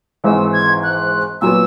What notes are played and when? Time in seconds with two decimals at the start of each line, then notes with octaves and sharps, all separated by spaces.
0.24 G#1 G#2 E3 G#3 E6
0.53 G#6
0.83 F#6
1.41 A#2 F#3 B3 E6